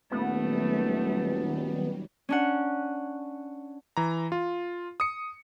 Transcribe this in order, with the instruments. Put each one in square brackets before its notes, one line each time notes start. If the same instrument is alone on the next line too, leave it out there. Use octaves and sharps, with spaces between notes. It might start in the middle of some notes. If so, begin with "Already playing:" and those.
[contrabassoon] D#1 [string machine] D#3 F#3 G3 [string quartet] A3 [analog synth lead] B3
[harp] C#4 D4 F#5
[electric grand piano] E3 A#5
F4
D#6 C#7